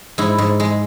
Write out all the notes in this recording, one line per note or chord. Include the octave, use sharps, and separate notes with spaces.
G#2 E4
G#2
G#3